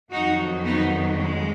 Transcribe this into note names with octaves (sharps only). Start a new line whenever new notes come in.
F2 D#3 F#3 D#4 F#4
B3 D#4
G#3